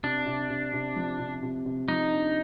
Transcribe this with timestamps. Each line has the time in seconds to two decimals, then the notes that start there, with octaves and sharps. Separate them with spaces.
0.03 C3 D4
0.26 C3
0.50 C3
0.73 C3
0.96 F3
1.19 C3
1.43 C3
1.66 C3
1.88 F3 D#4
2.12 D4